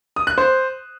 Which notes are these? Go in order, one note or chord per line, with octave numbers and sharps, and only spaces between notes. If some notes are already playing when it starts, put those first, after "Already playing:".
D#6
F#6
C5